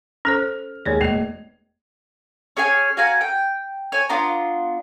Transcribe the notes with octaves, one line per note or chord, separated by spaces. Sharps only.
C#4 A4 C5 F6
D#2 G#3 C#5 D5 G#6
E1 A3 A#3 D#5 C7 F7
C#4 G#4 C#5 G#5
F#4 F5 G#5 A#5
G5
C#5 G#5
B3 D4 F4 A#5